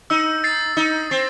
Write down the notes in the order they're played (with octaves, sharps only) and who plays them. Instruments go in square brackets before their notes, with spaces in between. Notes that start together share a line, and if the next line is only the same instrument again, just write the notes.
[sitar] D#4 [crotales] E6
[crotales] A6 C7
[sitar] D#4 [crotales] E6
[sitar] C4 [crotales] A6 C7